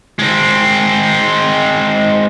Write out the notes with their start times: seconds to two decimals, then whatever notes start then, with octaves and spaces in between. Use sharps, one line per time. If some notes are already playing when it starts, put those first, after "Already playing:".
0.19 G#3 C4